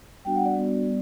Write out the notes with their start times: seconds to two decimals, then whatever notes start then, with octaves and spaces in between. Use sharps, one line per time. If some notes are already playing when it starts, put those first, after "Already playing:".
0.25 G3 B3 D4 F#4 G5
0.35 F#5
0.45 D5
0.56 G3 B3 D4 F#4
0.86 G3 B3